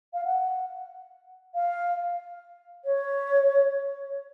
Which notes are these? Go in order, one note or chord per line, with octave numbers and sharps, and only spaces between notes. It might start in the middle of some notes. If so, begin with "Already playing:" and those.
F5
F#5
F5
C#5